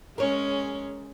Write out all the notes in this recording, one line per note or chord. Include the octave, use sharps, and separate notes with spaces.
G#3 C#4 A#4 C#5